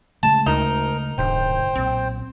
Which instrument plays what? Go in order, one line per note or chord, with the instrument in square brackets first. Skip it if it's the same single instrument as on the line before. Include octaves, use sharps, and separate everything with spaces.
[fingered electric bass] C#3 G#3 A3 [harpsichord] A5
[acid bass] D2 [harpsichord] D#4 [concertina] A#4
[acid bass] D1 [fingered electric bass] G2 B2 D3 [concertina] C5 G5
[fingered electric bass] B1 A#2 [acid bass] C4